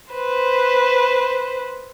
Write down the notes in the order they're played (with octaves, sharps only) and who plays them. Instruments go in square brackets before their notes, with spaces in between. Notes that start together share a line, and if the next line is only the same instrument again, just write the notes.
[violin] B4 C5